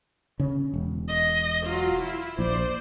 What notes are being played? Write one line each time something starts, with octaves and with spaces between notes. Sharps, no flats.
C#3 C#4
E1
D#5
F#3 F4
E4 F4
A#1 C5 D5